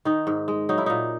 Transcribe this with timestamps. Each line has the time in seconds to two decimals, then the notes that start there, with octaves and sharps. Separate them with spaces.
0.05 D#3 D#4
0.27 G#2
0.48 G#3
0.69 F#3 D#4
0.78 E4
0.86 A#2 D#4